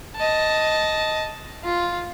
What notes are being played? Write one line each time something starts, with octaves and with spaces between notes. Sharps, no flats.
D#5 A5
F4